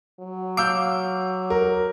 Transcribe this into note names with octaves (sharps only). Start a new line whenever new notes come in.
F#3
F5 D6 E6 G6
A#4